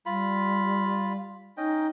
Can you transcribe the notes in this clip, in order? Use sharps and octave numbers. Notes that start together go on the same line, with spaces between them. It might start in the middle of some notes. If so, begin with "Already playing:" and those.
G3 F4 B5
C#4 D#4 D#5 G5